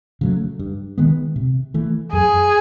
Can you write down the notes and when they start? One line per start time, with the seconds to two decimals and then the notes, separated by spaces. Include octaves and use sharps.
0.21 C#3 F#3 A3
0.59 G2
0.98 D#3 G#3 B3
1.36 C3
1.74 E3 A3
2.13 F#2 G#4